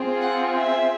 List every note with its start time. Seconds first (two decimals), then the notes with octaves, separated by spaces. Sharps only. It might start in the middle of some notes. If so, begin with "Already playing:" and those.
Already playing: C4 F4 G#4
0.20 F#5
0.56 E5